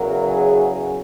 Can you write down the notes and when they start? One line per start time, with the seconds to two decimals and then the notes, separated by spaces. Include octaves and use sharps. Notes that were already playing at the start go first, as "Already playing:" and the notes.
Already playing: E2 C#3 F#3 A#4
0.29 G#4